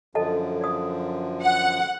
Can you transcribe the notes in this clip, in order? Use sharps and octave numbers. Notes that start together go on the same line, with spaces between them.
F#2 D3 F3 A4 D#5 A5
D5 D#6
F#5